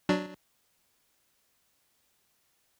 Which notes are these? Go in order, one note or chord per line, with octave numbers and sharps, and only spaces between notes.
F#3 D4